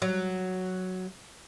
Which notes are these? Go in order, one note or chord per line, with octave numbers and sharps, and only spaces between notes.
F#3